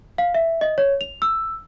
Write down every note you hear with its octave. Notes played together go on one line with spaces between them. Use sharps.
F5
E5
D#5
C#5
F7
E6